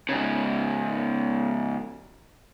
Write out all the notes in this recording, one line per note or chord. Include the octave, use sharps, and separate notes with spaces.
G#2 C#3